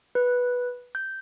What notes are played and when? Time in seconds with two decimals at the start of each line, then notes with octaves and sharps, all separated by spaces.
0.15 B4
0.95 G6